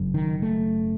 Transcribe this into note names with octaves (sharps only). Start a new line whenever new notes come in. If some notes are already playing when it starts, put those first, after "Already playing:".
Already playing: F#1 F#2
D#3
A3